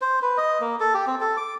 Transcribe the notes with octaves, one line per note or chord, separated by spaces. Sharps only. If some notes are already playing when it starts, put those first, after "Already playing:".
C5
B4
D#5
A#3
A4
G4
C4
A4
D6